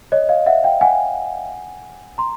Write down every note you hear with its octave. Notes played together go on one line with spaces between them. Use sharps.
C#5 D#5
D#5 F5
E5 F#5
F5 G5
F#5 G#5
A#5 C6